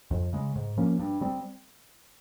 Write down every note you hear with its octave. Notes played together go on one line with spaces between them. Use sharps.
F2
C#3 G#3
G#2
F3 A#3 C#4
G2
G3 C4